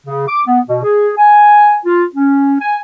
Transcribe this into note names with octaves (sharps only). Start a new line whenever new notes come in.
C#3
D6
B3
B2
G#4
G#5
F4
C#4
G#5